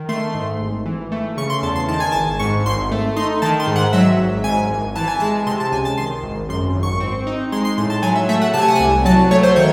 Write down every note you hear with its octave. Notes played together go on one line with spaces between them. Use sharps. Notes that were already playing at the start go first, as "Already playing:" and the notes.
Already playing: D#3
A3 C6
G#2
G#1
E3
A3
C#3 C#6
C6
E2 A5
C6
D#3 A5
G#5
G#1 A5
G#2 C#6
G#1 C6
A3
D#4 C6
D#3 A5
C6
G#2
F#5
F#3 E5
G#1
G#2 G#5
G#1
E3 A5
G#5
G#3 A5
C3 C6
A5
C#2 G#5
A5
D#3 C6
G#1
F#2 C6
G#1
C#6
C4
D#4
G#3 C6
C6
A2 C6
A5
F#3 G#5
E5
A3 E5
F#5
C3 A5
G#5
F#5
G#5
C2
F#3 A5
A3 C#5
C5
D#3 C#5